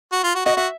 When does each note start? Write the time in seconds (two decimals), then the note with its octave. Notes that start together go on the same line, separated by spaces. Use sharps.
0.12 F#4
0.24 F4
0.35 F#4
0.46 F#4 D#5
0.57 F#4 E5